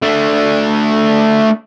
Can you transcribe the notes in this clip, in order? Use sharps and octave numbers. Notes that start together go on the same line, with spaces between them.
A3 D4